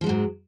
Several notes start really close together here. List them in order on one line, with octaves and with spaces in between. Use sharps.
F3 G#3 F#3 G#2